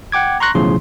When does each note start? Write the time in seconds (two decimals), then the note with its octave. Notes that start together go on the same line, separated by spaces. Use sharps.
0.12 F#5 G5 D6 G#6
0.40 A#5 C6 C#6 F#6 A#6
0.54 B1 E2 A2 C#3 F3 C6